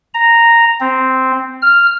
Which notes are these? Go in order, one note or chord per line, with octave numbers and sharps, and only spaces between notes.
A#5
C4
F6